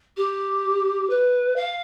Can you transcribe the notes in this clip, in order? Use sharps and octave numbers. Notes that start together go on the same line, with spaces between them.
G4
B4
F5